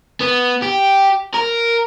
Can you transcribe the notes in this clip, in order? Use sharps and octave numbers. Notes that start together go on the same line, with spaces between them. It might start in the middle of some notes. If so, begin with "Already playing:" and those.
B3
G4
A#4